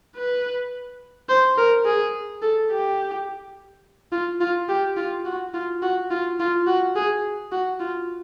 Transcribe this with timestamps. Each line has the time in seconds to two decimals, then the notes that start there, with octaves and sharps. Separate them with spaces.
0.16 B4
1.29 C5
1.58 A#4
1.86 G#4
2.42 A4
2.71 G4
4.12 F4
4.41 F4
4.69 G4
4.97 F4
5.26 F#4
5.54 F4
5.83 F#4
6.11 F4
6.40 F4
6.67 F#4
6.96 G#4
7.52 F#4
7.80 F4